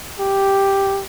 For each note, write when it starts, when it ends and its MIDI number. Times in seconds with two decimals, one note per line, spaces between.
0.20 1.03 67